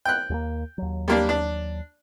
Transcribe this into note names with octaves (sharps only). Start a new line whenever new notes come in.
G5 F#6
D#2 G#3 A#3
D#2 F#3
G3 A#3 D4
D4